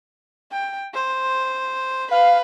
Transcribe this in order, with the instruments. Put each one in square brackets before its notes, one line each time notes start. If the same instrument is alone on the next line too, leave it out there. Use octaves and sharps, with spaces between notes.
[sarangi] G5
C5
[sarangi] B4 [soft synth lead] F5